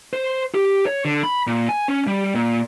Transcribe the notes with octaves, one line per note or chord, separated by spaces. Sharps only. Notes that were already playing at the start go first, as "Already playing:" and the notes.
C5
G4
C#5
D3
B5
A#2
G#5
C#4
G3
A#2